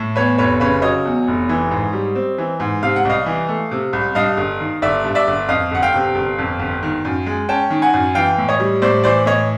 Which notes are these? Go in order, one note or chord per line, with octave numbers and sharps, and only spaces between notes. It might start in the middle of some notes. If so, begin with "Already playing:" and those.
Already playing: A2
E2 B4 C#5
F1 B4 C#5
C#3 B4 C#5
F#3 C#5 D#5
E2
F1
E3
G#2
G3
C4
E3
G#2
C3 F5
F#5
C2 D#5 F5
E3
A3
C3
C2
G2 D#5 F5
G1
D#3
G1 D5 E5
G2
D5 E5
G1
F2 D#5 F5
G1 F#5
F5 G5
C3
G1
F2
G1
D#3
F#2
G#3
C#4 G5 A5
D#3
F#5 G#5
F#2
E3 F5 G5
A2
C#5 D#5
G3
A2 C5 D5
E3 C5 D5
A2 C#5 D#5